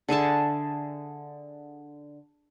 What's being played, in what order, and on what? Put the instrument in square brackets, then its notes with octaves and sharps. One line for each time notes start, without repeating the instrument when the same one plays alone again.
[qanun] D3 G#4 E5 A5